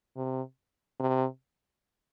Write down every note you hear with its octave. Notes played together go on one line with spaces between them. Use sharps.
C3
C3